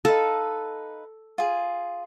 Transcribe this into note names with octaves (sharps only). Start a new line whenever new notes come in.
D#4 A4 B4 F5
F4 G#4